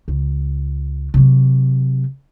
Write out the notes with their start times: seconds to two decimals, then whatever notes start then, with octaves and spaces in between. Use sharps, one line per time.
0.08 C#2
1.14 C3 F#3